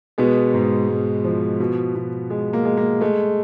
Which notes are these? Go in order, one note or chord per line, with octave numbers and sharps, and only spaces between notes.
B2 G#3 B3
G#2
G#2
F3
B2
B2
G#3
A#3
G#3
A#3
G#3 A3